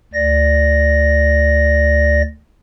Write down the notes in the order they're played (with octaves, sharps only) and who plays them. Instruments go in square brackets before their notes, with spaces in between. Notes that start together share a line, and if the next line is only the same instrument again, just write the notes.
[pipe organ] D2 D5 A#6